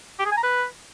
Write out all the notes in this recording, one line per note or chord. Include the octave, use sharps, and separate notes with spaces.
G4
G#4
G#5
A#5
B4